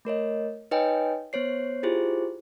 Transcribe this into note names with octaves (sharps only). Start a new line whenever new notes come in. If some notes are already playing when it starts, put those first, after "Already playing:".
A3 A#4 C#5 D#5
D#4 B4 C#5 D#5 G5 G#5
B3 C5 C#5 C7
E4 F4 G4 G#4 C5